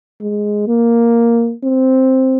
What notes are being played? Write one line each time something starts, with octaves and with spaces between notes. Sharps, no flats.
G#3
A#3
C4